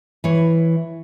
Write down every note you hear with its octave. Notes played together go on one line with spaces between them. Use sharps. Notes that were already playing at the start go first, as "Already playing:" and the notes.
E3 E4 C#5